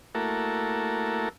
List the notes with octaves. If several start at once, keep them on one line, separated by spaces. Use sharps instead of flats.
A3 A#3 E4 F#4 A4 A#4